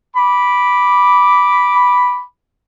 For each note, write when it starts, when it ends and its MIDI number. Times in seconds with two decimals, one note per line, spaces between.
0.16 2.22 83
0.16 2.22 86